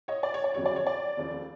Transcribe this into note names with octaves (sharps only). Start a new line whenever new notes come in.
C#5 D#5
D5
C#5
D5
G1 F2 C#3 F#3 C#5
D5
C#5
D5
F1 D#2 C#3 F3